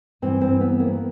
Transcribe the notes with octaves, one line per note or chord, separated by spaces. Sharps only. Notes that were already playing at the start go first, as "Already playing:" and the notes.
G2 E3 C4
C4
B3
A#3